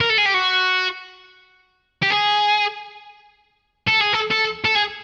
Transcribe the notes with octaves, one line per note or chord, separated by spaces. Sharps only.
A#4
A4
G#4
G4
F#4
G4
G#4
A4
G#4
A4
A4
A4
G#4